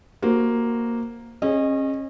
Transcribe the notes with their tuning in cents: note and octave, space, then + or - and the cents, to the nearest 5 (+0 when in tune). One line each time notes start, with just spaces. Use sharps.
A#3 +0 F#4 +0 C5 +0
C#4 -35 G#4 +0 D#5 -15